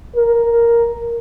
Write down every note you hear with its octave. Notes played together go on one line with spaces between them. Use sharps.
A#4